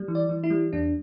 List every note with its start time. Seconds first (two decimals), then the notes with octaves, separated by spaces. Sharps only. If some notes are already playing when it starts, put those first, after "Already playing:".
Already playing: G3
0.08 E3
0.15 D5
0.29 E3
0.43 E4
0.50 G3
0.73 E2 D4